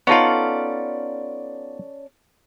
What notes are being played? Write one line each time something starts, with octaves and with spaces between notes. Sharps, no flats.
B3 C#4 D#4 F4 A4 D5